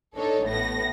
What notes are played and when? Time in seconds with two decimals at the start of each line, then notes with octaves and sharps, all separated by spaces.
0.16 D4 D#4 A4 C#5
0.45 A1 A2 B3 A#6